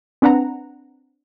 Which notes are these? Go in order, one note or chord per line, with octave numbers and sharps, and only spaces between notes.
C4 D4 B4 F#5 A#5